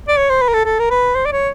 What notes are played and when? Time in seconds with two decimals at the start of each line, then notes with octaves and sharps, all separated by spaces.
0.08 D5
0.17 C#5
0.29 C5
0.41 B4
0.48 A#4
0.53 A4
0.65 A4
0.79 A#4
0.90 B4
1.15 C5
1.26 D5
1.32 C#5